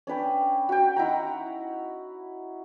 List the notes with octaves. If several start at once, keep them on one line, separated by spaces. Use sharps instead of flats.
C#4 D4 B4 G5
F#4 G5
D#4 E4 F#5 A#5